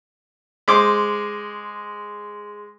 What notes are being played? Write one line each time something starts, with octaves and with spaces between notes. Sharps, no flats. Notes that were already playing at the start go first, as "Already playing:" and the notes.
G#3 C5 D6